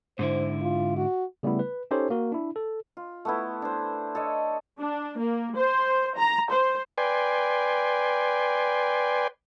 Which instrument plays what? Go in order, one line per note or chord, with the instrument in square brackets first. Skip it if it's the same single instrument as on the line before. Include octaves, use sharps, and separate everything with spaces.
[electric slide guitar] G#2 D3 E4 [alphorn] C5
[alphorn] F4
F#4
[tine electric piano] C#3 G3 A3 B3 E4
B4
C#4 D#4 G4 A4 C5 C#5
A#3 F#4 A#4
D4 E4
A4
[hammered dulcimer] F4
A3 B3 E4
D4 C5
A4 C#5 D#5
[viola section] D4
A#3
C5
A#5
C5
[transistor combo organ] B4 D5 G5 G#5 C6